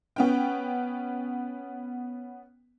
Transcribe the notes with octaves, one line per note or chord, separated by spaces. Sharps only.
B3 C#4 G5